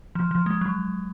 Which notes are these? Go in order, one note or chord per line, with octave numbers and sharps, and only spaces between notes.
F3
F3
G#3
F#3